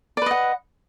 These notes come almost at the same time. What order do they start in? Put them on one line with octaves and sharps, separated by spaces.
D5 B4 D#5 F#5